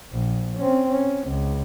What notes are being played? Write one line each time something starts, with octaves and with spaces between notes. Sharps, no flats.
A#1
C4 C#4
C#4
C#2